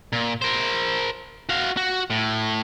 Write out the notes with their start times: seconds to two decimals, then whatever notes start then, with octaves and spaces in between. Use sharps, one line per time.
0.13 A#2
0.42 A#4 C5
1.49 F#4 F5
1.77 F#4
2.10 A2